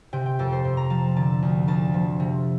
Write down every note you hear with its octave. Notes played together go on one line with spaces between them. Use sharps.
C3 G5
G5
F2 A4
C5
F2
A#5
F3 A5
D3 A5
D2
D2 A5
F3
C3